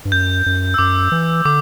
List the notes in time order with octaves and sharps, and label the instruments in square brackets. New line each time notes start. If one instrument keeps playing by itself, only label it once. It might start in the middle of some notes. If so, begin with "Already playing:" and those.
[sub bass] G2
[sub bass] F#2 [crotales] G6
[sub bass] F#2
[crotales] E6
[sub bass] F#2 [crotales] D6
[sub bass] E3
[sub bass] D3 [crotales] D6